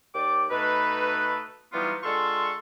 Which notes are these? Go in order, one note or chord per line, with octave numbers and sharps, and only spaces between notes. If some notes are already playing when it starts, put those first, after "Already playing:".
D#2 D5 G5 D6
B2 A3 D#4 B4
E3 F#3 G3 B3 D#4 F4
D3 G#3 F4 A4 C6 C#6